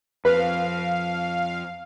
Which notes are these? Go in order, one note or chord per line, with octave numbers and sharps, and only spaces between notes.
F2 B4 F5